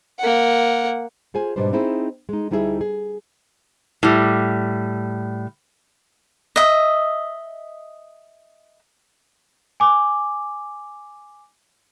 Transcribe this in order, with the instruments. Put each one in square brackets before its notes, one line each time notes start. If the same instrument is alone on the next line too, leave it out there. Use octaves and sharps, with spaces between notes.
[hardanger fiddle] A#3 F#5
[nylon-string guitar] F4 G#4 C5 G#5
G#2 B2 G3 D4 B4 C5
C4 D#4 E4 G#4 C5
G#3 D#4
D2 G3 D#4 E4 G#4 E5
G#4
[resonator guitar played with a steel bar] A2 G3
[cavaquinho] D#5 E5
[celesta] G#5 D6